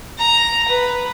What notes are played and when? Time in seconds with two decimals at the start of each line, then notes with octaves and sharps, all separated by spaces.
0.18 A#5
0.68 B4